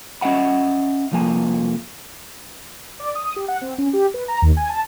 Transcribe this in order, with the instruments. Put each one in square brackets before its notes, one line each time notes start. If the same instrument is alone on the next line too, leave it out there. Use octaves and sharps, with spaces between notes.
[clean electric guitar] C#4 D#5 E5 F#5 B5
C2 F2 F3 A#3 G#5
[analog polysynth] D5
D#6
G4
F#5
C4
C#4
G4
B4
A#5
D#2
G#5
A5